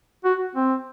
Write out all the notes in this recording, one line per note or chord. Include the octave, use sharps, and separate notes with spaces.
F#4
C4